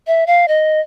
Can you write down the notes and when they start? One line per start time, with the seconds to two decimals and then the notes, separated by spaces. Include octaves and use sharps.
0.07 E5
0.27 F5
0.48 D#5